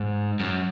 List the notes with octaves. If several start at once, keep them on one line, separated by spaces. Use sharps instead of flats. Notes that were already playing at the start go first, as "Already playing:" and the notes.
Already playing: G#2
F#2